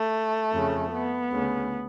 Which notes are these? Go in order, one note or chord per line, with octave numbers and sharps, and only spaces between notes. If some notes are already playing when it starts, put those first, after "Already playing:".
Already playing: A3
F2 C#3
B3
D2 C#3